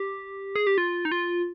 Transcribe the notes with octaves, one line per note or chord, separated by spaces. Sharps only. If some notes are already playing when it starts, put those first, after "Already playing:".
Already playing: G4
G#4
G4
F4
D#4
F4